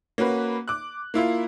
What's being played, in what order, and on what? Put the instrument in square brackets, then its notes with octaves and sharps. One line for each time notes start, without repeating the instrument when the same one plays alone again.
[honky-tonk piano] A#3 C#4 F#4 B4
D6 F#6
A#3 E4 F4